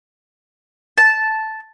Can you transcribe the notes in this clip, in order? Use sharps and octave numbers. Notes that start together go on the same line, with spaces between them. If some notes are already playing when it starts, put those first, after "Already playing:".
A5